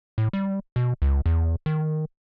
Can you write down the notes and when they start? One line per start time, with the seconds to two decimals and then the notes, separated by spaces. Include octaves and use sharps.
0.18 A2
0.33 G3
0.76 B2
1.02 C#2
1.26 E2
1.66 D#3